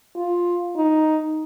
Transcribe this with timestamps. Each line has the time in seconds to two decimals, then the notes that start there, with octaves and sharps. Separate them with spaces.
0.16 F4
0.76 D#4